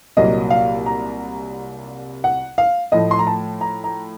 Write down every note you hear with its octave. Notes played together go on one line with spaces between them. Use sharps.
C2 A#2 F#3 A#3 D#5
F5
A#5
F#5
F5
A2 F3 A3 D#5
C6
A#5
A5
A#5
A#5